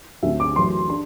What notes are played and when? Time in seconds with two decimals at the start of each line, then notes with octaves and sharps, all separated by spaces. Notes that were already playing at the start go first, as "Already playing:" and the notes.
0.23 D2 D3 A3 C4 E5
0.40 D6
0.56 F#2 E3 A3 C6
0.89 D4 C6